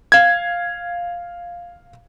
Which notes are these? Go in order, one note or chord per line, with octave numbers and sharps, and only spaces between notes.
F5 G#6